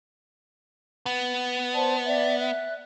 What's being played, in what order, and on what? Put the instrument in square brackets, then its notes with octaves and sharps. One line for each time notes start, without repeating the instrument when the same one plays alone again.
[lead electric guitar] B3
[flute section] C5 D5 A5
D5 E5
E5 F#6